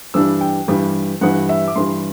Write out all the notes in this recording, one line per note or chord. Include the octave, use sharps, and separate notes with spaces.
G2 E3 G3 D4 E6
G5
G2 E3 G3 D4
G2 E3 G3 F#5
E5
D6
G2 E3 G3 C6